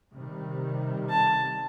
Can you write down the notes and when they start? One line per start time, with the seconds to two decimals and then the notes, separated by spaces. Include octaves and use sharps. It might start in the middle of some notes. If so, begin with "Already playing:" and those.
0.12 C3 D#3 G3
1.09 A5